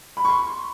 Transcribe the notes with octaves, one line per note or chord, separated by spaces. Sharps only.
B5
C#6
C6